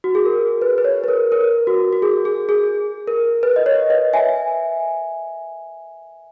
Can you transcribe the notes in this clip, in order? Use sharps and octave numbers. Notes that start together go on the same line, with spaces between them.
F#4
G#4
A#4
B4
B4
C#5
B4
A#4
A#4
F#4
F#4
G#4
G#4
G#4
A#4
B4
D#5
C#5
B4 D#5
E5 G#5